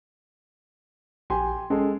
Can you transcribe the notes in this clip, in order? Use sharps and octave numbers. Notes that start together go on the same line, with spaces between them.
A#1 G4 G#5 C6
G#3 C#4 G#4 A4